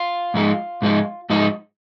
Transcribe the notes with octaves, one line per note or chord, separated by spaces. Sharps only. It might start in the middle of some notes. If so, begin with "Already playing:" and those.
Already playing: F4
G#2 F3 G#3 D#4
G#2 F3 G#3 D#4
G#2 F3 G#3 D#4